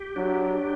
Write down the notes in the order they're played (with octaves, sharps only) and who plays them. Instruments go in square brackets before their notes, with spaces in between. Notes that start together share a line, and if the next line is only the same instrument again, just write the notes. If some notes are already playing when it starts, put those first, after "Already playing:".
Already playing: [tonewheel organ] G4
[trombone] F#3 [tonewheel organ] D4
[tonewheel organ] G4